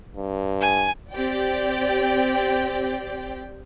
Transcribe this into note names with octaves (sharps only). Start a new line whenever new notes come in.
G2
G#5
C4 G4 D5 G5